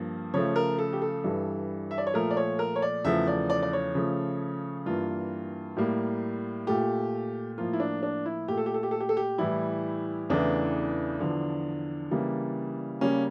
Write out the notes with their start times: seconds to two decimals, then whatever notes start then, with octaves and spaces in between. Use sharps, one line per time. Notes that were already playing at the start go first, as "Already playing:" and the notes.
Already playing: G2 F3 A#3
0.34 C#3 F3 A3 C#5
0.56 A#4
0.78 A4
0.93 G4
1.02 A4
1.24 G2 E3 G3
1.91 E5
1.98 D5
2.07 C#5
2.14 A#2 F3 A3 A#4
2.31 D5
2.37 C#5
2.59 A#4
2.76 C#5
2.82 D5
3.04 E2 C#3 F3 A3 E5
3.27 D5
3.50 D5
3.62 D5
3.73 C#5
3.95 C#3 F3 A3
4.86 G2 E3 A#3 F4
5.77 A2 G3 A#3
6.67 A#2 A3 G4
7.58 A2 F3 A#3 F4
7.73 E4
7.80 D4
8.03 D4
8.26 E4
8.48 A#2 A3 G4
8.58 A4
8.66 G4
8.74 A4
8.83 G4
8.91 A4
9.00 G4
9.09 A4
9.17 G4
9.38 A2 E3 G3 E4
10.30 E2 C#3 E3 A3 D4
11.20 E2 D3 F3
12.11 C#3 E3 G3 A#3
13.01 C#3 G3 A#3 C#4